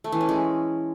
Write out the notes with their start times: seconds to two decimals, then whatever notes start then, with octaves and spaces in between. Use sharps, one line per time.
0.04 A3
0.12 E3
0.21 C#4
0.29 G#3